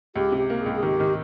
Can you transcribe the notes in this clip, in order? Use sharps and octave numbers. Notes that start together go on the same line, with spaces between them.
C#2 G4
C3
G4
A#3
C#2 G#4
G#4
D#3 G4
D#3